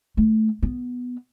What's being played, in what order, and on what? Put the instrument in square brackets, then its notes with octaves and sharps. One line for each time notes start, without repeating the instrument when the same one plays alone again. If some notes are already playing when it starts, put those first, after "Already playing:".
[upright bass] A3
B3